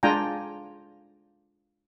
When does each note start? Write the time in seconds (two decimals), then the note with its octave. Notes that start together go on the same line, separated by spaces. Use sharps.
0.03 G#3 D4 F4 G5 G#5 A#5